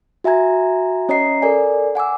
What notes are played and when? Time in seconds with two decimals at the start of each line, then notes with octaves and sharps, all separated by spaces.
0.24 F#4 E5 G#5 A#5 G#6
1.09 C#4 C#5 D#5 A#5 C7
1.42 A4 A#4 D5 G#5
1.95 F#5 G#5 D6 E6